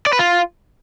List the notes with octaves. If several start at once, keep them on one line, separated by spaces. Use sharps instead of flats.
D5
B4
F4